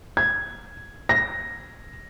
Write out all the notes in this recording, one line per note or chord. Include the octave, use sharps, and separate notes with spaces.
G#6
A#6